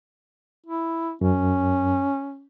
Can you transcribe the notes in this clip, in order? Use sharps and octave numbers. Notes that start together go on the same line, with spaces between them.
E4
F#2 C#4